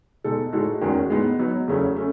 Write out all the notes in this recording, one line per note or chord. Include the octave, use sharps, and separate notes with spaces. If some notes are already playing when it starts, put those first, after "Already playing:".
B2 G#3 D#4 A4
A2 G#3 D#4 F#4 A4
E2 D#3 G#3 C#4 F#4
A2 G#3 B3 D#4
F#3 B3 D#4
E2 C#3 F#3 A3 C#4
A3 C#4